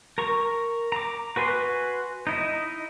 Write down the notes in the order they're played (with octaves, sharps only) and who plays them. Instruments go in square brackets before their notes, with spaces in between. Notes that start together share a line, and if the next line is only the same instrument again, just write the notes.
[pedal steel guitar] A#4 A#5 C#6
A#5 D6
F#4 B4 G#5 C6
D#4 E4 D#5